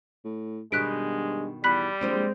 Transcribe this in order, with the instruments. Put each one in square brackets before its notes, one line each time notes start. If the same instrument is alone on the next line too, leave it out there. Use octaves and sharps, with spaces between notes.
[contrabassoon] A2
[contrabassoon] G2 [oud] B2 D#3 B3 [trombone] G#3 [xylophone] F#6 B6 D7
[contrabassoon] E2 [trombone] G3 [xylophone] B5 F#6 B6
[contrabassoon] A#1 [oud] G#3 C4 D5